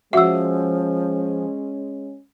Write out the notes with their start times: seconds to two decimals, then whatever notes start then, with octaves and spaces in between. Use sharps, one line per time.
0.13 F3 G#3 C#4 F#4 E5 F#5 E6